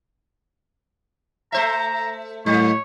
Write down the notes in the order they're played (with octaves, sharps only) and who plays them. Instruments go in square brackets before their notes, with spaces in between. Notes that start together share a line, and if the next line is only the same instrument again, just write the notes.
[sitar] A3 C5 E5 [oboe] A#5
[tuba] A2 [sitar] F#3 A#3 [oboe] C#5